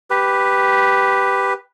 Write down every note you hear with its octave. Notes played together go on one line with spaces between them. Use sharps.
G4 B4